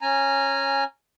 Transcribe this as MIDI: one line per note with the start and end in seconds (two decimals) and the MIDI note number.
0.01 0.84 61
0.01 0.84 80
0.01 0.84 82